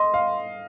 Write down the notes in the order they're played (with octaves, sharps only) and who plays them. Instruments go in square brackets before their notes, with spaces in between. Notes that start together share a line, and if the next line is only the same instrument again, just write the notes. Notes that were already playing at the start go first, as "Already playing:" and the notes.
Already playing: [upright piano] D#5 [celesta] C6
[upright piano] F5